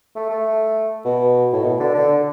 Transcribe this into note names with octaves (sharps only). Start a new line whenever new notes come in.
A3
A3
B2
A2
B2
D3
D3